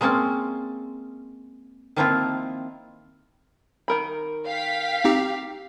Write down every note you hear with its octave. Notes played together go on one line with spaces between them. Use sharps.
G#3 A#3 C4 C#4 A5
D#3 F3 A#3 C4 E4 F4
D#3 A#4 B5
F5 G5 B6
C4 D#4 G4